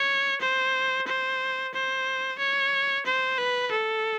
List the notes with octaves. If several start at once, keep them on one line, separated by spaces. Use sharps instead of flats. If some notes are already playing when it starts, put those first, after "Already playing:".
Already playing: C#5
C5
C5
C5
C#5
C5
B4
A4